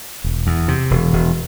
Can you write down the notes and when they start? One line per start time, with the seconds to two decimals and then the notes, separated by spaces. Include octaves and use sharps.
0.24 E1
0.47 E2
0.68 C3
0.91 E1
1.13 E1